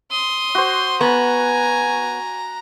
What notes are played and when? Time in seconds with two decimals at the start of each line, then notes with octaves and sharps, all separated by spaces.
0.11 C6 D#6
0.55 F#4 C5
1.01 B3 G#5 A#5 C#6